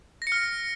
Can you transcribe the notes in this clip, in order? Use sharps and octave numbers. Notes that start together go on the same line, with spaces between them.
A#6
C#7
F6